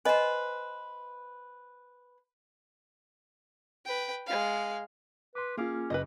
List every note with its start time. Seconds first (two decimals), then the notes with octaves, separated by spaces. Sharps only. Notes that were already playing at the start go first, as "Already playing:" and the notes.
0.05 B4 C5 D#5 G#5
3.85 B4 G5
4.27 G#3 F5
5.35 B4 C6 D6
5.57 A#3 C#4 F4 G#4 F5 D6
5.90 F#1 B4 C5 D#5